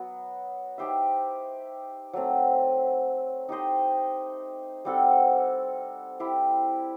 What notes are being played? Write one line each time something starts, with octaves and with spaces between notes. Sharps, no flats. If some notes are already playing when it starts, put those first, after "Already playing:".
Already playing: F#3 B3 F#4
D#4 G4 C5 E5
F#3 A3 C4
D#4 G4 C5 D#5
G3 C4 F#4 A4
E4 G4 C5